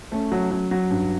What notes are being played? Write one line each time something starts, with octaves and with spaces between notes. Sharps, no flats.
A3 C#4
F#3
F#3
F#3
G2